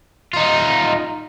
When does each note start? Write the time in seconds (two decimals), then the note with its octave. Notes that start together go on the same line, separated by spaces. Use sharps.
0.33 D#4 F4